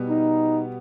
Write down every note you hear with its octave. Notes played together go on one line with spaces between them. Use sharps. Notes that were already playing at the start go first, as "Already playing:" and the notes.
Already playing: B2 G3 B3
D#4